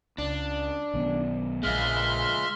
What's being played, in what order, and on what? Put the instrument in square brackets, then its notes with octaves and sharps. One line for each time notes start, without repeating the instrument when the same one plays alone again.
[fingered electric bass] C#2 [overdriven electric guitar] D4
[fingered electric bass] B1 D#3 B3
[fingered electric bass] A#1 A#2 [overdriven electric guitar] G#3 F4 [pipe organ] E5 C6 F6